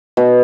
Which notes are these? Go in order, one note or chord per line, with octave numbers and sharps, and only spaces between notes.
B2